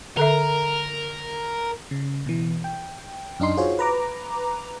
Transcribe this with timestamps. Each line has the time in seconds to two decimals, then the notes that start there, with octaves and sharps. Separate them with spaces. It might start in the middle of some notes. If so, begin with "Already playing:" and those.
0.17 D3 A4 A#4 E5
1.91 C#3
2.26 B2 E3
2.64 G5
3.40 F#2 D4 D#4 C6
3.57 F4 F#4 G#4 C5 C#5
3.79 B4 A#5 D6